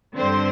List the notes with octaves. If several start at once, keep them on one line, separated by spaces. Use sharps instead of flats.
G2 D3 C4 C5